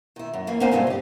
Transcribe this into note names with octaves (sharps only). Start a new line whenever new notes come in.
D#3 E4
F#2
E3 A#3
B3 C#4 D#4 C5 F5 G#5
G2 C#3 G#3 A3 C4
G4 G#4